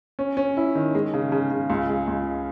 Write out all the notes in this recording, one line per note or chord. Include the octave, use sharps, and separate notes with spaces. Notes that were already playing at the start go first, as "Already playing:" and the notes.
C#4
C#4
E4
D#3
G#3
C#3
C#3
C#3
C#2
G#3
C#2